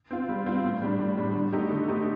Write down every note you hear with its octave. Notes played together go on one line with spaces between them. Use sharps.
C4 F4
G3
C4 F4
A2
G3 D4
A2
G3 D4
D3
A3 D#4 G4
D3
A3 D#4 G4